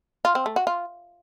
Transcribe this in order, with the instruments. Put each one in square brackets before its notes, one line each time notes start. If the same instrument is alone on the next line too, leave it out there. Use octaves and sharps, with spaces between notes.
[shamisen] F4
C4
A3
F#4
F4